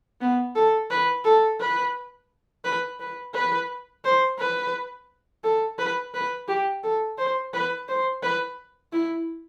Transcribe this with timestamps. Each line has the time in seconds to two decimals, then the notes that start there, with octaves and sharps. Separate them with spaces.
0.21 B3
0.56 A4
0.91 B4
1.25 A4
1.61 B4
2.65 B4
3.00 B4
3.34 B4
4.04 C5
4.39 B4
5.44 A4
5.79 B4
6.14 B4
6.48 G4
6.84 A4
7.18 C5
7.54 B4
7.89 C5
8.23 B4
8.93 E4